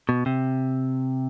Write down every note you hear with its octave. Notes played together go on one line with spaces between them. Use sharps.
B2
C3